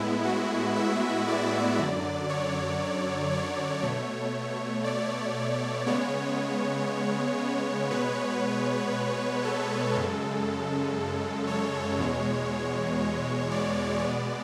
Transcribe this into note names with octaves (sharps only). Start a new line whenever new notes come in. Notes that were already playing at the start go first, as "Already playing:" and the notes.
Already playing: A2 G#3 B3 E4
F#4
E5
D5
F#2 D3 F#3
C#5
C#5
B2 A3 C#5
D5
C#3 G#3 B3 C#5
B2 G#3 B3 B4
B4
A4
F#2 C#3 G#3 A4
C#5
E2 B2 G#3
D5
B2 G#3 B3 D5